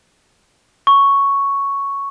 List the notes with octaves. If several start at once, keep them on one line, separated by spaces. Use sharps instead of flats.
C#6